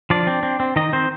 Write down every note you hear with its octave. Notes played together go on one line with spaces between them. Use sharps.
F3 D4 D5
C4
C4
C4
D#3 D#4 D#5
D#3 C4 C5